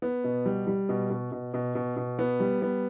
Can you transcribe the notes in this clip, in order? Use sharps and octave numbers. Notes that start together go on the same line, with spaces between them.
B3
B2
G3
G3
B2
B2
B2
B2
B2
B2
B3
G3
B3